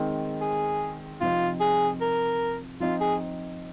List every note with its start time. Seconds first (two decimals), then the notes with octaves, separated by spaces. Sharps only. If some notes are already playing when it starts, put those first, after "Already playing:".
Already playing: D#3 G#3 C4 D#4
0.41 G#4
1.21 C3 F3 C4 D#4 F4
1.60 G#4
2.01 A#4
2.80 F3 C4 D#4 F4
3.01 G#4